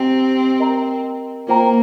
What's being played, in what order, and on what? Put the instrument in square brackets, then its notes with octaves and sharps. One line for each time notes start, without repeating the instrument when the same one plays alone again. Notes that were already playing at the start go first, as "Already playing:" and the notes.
Already playing: [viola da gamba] C4 [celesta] G4 D#5 A#5
[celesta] A#4 D#5 A#5
[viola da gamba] A#3 [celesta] F4 C5 G5 A#5